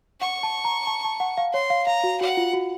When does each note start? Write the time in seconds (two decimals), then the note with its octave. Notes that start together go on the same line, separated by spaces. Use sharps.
0.21 F#5 C#6
0.43 A5
0.65 A#5
0.87 A5
1.05 A5
1.20 F#5
1.38 F5
1.53 C#5 C6
1.70 F5
1.87 F5 A#5
2.04 F#4
2.21 F#4 F#5
2.37 F4
2.53 F#4